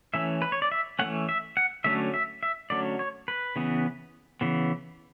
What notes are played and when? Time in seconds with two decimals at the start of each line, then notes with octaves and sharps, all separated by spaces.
0.14 E3 A3 C#4 E5
0.42 B4
0.52 C#5
0.62 D5
0.72 E5
0.99 E3 A3 C#4 F#5
1.29 E5
1.57 F#5
1.84 D3 F#3 A3 C#4 E5
2.14 E5
2.43 E5
2.70 D3 F#3 A3 C#4 D5
2.99 C#5
3.28 B4
3.56 C#3 E3 B3
4.41 C#3 E3 B3